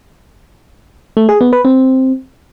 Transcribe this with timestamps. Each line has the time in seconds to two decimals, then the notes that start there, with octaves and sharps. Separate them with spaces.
1.17 A3
1.29 G#4
1.41 B3
1.53 B4
1.65 C4